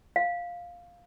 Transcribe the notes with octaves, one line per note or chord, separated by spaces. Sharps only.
F5